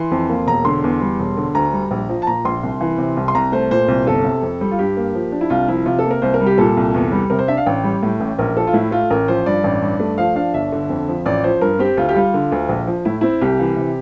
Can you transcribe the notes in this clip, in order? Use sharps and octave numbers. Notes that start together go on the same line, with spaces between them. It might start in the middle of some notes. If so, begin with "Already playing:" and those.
Already playing: E3 C6
F2
A#3
E1 A#5
D3 C6
E2
G3
E1
D3
D2 A#5
G3
A#1
F3
A5
A#2 A#5
A#1 C6
C2
E3
C3
C2
C6
C2 A#5
A3 C5
A#2 C5
C2
G1 A4
C3
F2
G3
F4
G2 G4
A#3
F3
D4
E4
C2 F4
F3 E4
C3 F4
A4
A#3
A#4
C2 C5
A#4
G3
G4
A#2 A4
C2
E2
G3
C3 A#4
C5
D4 E5
F5
A1 G5
G3
A2
A1
A#1 A#4
F3 A4
F4
A2 E4
A3 F4
A1 A#4
F3 C5
G2 D5
A1
G2
A3
F3 F5
D4 F5
G1 E5
D3
F2
F3
A1 D5
F3 C5
G2 A#4
C4 G4
D2 F4
G4
G3 F4
D3
D2
A#1
F3
A2 E4
C4 E4
C2 G4
E3
C3